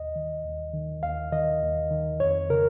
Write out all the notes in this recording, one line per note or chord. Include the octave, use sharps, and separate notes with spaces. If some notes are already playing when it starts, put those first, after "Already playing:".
Already playing: D#2 D#5
D#3
D#2
D#3
D#2 F5
D#3 D#5
D#2
D#3
F2 C#5
C#3 A#4